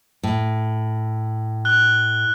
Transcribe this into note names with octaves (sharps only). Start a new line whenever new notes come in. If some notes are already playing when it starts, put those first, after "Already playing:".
A2
F#6 G7